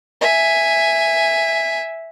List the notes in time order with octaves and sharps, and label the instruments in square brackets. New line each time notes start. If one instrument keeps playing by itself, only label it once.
[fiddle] E5 G#5